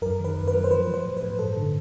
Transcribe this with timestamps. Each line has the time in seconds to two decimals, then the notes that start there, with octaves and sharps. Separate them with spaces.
0.02 F#2 A#4
0.19 D#3
0.25 B4
0.36 F#2
0.48 B4
0.54 F#3
0.64 C5
0.71 F3 B4
0.87 F3
0.94 C5
1.05 A2
1.17 B4
1.23 A2
1.39 G2 A4
1.57 D3